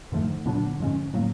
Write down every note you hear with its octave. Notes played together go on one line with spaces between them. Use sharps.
G2 D3 D#3 F3 A3
A#2 D3 F#3 B3 D4
G#2 F3 G#3 C#4
A2 F#3 A#3